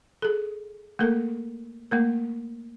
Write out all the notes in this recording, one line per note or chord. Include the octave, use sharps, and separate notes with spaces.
G#4 A4
A3 A#3 A4 A#4
A3 A#3 A#4